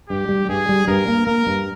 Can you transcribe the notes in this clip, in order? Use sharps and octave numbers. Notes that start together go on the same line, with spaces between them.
G2 G4
G3
G2 G#4
G3
G2 A#4
A#3
A#3 A#4
G2